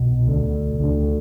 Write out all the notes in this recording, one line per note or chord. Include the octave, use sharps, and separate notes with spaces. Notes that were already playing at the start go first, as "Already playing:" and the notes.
Already playing: C2 B2
D2 D3
D2 D3